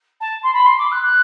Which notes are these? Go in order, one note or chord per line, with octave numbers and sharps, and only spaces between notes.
A5
C6
B5
C6
D6
F#6
F#6